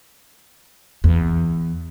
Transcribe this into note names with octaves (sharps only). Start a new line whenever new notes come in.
E2